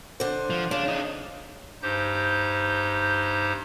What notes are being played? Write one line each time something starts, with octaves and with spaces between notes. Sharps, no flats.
D3 C5
F3
C#3 D4
D4 D#4
G2 D#4 G4 C5 G6